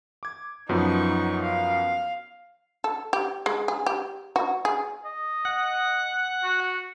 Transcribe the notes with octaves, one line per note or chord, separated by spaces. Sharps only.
D6 G#6
F#2 F3 B3 D#4 C#6
F5
A4
G4
G#3
G#4
G4
F#4
G#4
D#5
F#5
F#4